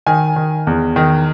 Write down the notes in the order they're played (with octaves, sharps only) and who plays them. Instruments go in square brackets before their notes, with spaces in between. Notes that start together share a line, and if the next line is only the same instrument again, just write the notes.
[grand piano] D#3 G#5
D#3
E2
D#3